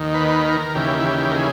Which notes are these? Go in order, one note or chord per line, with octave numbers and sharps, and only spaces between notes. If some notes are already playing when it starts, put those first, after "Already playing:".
Already playing: D#2 D#3
B4
A#4
D#2 C#3 E3 G4
E4
G4
A#4
G#4